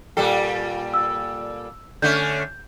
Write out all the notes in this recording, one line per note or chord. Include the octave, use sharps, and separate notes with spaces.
A#2 G3 A4 G5 D6
E6
D3 A3 C#4 G6